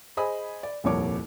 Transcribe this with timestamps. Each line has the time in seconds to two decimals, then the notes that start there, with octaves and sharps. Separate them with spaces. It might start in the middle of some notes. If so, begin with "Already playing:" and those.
0.17 G#4 C5 D#5 G#5 B5 D#6
0.63 D5
0.84 D#1 C2 F2 A#3 C#5 D6